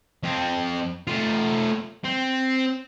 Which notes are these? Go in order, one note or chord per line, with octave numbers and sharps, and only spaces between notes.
F2 C4
A3 F4
C4